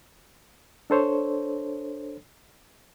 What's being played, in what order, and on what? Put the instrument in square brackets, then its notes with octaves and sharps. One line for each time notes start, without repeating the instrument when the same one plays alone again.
[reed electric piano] D4 A4 C5 C#5